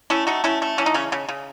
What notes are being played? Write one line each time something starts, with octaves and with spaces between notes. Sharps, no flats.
A3 C#4 E4
A3 D#4 F#4
A3 C#4 E4
A3
E3 C#4
D#4
C#3 C#4
C#3
C#3